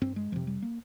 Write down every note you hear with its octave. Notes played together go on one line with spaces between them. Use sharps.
G2 C4
G#3
F2 C3 F3
G3
A#3